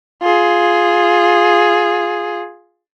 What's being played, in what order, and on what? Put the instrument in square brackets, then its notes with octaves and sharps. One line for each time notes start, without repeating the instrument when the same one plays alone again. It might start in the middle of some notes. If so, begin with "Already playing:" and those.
[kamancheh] F4 G#4